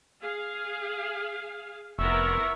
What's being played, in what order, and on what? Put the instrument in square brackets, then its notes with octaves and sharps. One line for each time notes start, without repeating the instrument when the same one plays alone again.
[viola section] G#4 F5
[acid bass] F1 [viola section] B3 E4 A#4 [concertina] E5 C#6 E6